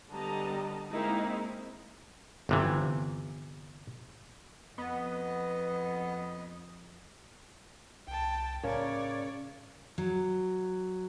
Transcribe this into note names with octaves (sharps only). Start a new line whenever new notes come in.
D3 G3 B3 D#5 A5 A#5
G#3 A#3 C4 D#4 E4
G1 C3 E3
F2 B3 D#5
C2 G5 A5
A2 C#3 A#4 C#5 D5
F#3